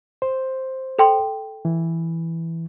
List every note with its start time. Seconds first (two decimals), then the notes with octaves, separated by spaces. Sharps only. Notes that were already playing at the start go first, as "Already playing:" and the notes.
0.22 C5
0.99 A4 G5 C6
1.65 E3